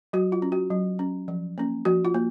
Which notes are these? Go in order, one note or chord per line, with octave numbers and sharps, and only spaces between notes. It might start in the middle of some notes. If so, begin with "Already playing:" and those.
F#3 F#4
F4
C#4
F#4
F#3
C#4
F3
A#3 C#4
F3 F#4
F4
A#3